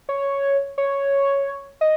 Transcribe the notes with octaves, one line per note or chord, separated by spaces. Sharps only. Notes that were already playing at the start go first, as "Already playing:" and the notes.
C#5
C#5
D#5